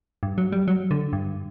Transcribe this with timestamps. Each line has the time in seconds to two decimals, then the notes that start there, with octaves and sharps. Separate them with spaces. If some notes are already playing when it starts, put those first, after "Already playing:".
0.23 G2
0.38 F#3
0.52 G3
0.68 F#3
0.91 D3
1.13 G2